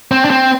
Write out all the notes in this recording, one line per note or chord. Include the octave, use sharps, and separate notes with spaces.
C4
D4
C4